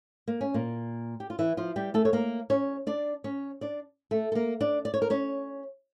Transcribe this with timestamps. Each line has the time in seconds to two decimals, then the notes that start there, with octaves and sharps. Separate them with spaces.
0.28 A#3
0.41 C#4
0.54 A#2 A#3
1.20 G4
1.30 F4
1.39 E3 E4
1.57 F3 F4
1.76 G3 G4
1.94 A3 A4
2.05 C#5
2.13 A#3 A#4
2.50 C#4 C#5
2.87 D4 D5
3.24 C#4 C#5
3.61 D4 D5
4.11 A3 A4
4.32 A4
4.35 A#3 A#4
4.61 D4 D5
4.85 D5
4.94 C#5
5.02 A#4
5.10 C#4 C#5